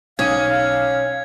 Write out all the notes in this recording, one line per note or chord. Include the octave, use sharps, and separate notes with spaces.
B1 C#4 F5 D#6 G#6 D#7